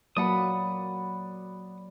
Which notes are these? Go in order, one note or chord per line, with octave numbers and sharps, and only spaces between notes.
F#3 A#3 D5 F#5 B5 D#6